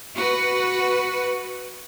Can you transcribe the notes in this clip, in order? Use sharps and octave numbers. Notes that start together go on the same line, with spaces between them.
F#4 B4